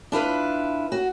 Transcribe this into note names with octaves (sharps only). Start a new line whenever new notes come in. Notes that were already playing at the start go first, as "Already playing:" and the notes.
D4 E4 F4 B4
F#4